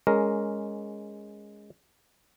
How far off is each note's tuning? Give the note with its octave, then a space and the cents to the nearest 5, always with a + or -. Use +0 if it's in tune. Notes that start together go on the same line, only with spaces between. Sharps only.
G#3 +0 C#4 +10 A#4 +0